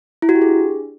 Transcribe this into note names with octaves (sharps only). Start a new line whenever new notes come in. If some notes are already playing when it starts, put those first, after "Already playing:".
E4
F#4
G4
G#4
D4